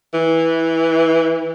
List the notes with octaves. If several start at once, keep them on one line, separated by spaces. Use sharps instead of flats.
E3